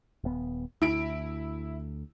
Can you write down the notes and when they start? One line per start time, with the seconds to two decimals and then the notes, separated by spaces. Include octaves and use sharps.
0.24 D#1 B3
0.82 D2 E4 D7